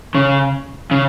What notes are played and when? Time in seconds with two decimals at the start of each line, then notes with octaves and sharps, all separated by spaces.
0.15 C#3
0.91 C#3